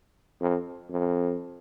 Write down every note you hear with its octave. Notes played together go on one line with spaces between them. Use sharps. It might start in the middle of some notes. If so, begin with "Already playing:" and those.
F2
F2